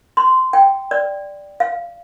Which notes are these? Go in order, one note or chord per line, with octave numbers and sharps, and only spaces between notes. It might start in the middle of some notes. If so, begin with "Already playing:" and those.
C6
G5
D5
F5